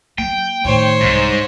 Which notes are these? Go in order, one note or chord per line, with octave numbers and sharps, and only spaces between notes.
F#3 A#3 G5
A2 D#3 C5 C#5
C2 G#2 G3